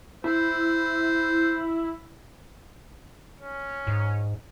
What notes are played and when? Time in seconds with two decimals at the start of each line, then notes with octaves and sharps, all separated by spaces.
0.24 E4 C5
3.40 C#4
3.87 G#2